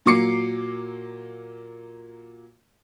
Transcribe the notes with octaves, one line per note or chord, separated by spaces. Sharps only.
A#2 F#3 A#3 D6 C7 C#7